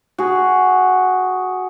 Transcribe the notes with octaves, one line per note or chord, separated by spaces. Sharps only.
F#4 G#4